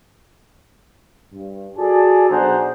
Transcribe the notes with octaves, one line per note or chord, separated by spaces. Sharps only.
G2
F#4 G#4 A4 D5 G#5 A5
B1 D4 G#4 C5 F#5 A#5